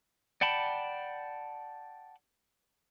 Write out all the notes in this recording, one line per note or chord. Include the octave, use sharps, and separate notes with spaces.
D5 F#5 G5 A5 B5